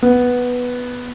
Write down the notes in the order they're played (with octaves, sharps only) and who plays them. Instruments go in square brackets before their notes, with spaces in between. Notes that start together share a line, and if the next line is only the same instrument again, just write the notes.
[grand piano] B3